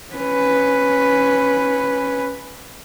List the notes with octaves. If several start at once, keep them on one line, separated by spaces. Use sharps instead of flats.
C#4 B4